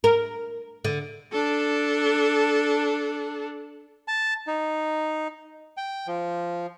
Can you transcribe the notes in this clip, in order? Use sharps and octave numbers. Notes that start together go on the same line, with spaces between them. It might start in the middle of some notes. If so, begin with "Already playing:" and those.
A#4
D3
D4 A4
A5
D#4
G5
F3